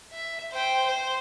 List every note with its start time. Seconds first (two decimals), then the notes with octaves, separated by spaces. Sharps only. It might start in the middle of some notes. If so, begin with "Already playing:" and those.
0.12 E5
0.52 C5 G5
0.86 C5